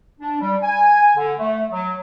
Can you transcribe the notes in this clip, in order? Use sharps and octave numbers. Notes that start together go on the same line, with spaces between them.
D4
G3
G#5
D3
A3
F#3